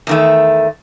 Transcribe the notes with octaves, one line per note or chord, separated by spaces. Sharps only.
E2 D#3 A3